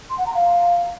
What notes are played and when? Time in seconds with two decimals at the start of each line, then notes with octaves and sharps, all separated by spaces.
0.09 C6
0.17 F#5
0.26 A#5
0.34 F5